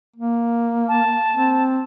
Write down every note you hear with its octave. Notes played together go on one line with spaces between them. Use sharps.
A#3
A5
C4